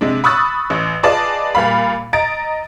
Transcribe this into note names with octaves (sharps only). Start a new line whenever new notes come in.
C3 G#3 D4
B5 C#6 D#6 E6 F#6 A6
A1
F4 G#4 B4 D5 D#5 A5
A#2 G3 F5 B5
D#5 A#5 A6 D7